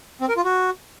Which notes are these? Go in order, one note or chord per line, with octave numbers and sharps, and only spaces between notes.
C4
A#4
F4
F#4